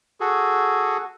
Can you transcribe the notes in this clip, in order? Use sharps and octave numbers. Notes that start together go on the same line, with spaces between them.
F#4 G#4 A4